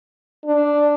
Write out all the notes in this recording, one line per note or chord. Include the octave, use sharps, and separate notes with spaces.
D4